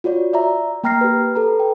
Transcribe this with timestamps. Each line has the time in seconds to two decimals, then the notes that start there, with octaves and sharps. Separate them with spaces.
0.04 F4 F#4 C#5 D5
0.33 D5 E5 A#5
0.84 A#3 G5 A#5 F6 A#6 C7
1.01 G4 B4
1.35 A4 B4 A#5
1.60 G5